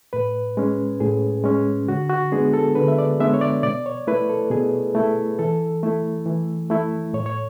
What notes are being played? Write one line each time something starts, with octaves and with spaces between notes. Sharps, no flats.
A2 B4
G#3 C#4
A2 G#4
G#3 C#4
D3 F#4
F#4
G#3 B3 D4 G#4
A4
D3 B4
E5
D5
G#3 B3 D4 E5
C#5
D5
B2 D5
C#5
A3 E4 B4
A4
B2 G#4
A3 E4
E3 A4
A3 E4
E3
A3 E4
A2 C#5
C#5